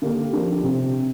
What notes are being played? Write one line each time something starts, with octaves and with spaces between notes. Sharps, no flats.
D3 A#3 G4
F3 D4 G4
C3